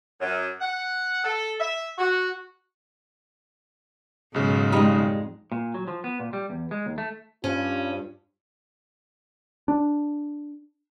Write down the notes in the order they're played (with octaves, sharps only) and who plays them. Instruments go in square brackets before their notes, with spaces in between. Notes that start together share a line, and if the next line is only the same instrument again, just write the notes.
[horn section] F#2
F#5
A4
E5
F#4
[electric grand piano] B1 C#3 [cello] G#2
[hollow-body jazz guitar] F2 D#4 B5 [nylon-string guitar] G3 G#3
[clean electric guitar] A#2
F#3
F3
B3
A#2
G3
E2
G#3
D#2
A3
[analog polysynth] G2 [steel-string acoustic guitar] C#4 [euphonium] F4
[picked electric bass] D4